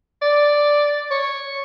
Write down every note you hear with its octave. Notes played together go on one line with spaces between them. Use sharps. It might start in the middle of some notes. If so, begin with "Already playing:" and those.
D5
C#5